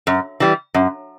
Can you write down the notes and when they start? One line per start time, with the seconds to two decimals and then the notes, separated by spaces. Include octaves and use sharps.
0.07 F#2
0.40 E3 G3
0.74 F#2